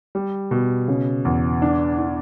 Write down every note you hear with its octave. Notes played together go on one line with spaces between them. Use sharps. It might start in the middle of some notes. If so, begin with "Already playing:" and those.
G3
B2
C#3
E2
D4
D4